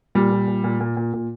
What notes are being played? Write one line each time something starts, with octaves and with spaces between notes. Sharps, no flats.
A#2 G3
A#2
A#2
A#2
A#2
A#2
A#2